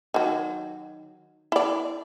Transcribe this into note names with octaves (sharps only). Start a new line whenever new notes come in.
D#3 F#3
E4 D5